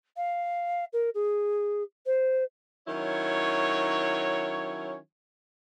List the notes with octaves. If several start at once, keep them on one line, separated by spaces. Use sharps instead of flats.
F5
A#4
G#4
C5
D#3 F#3 C#4 E4 C#5